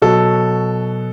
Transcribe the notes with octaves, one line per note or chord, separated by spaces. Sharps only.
B2 F#3 A4